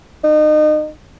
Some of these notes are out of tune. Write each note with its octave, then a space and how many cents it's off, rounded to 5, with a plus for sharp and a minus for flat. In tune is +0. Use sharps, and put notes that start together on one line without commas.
D#4 -30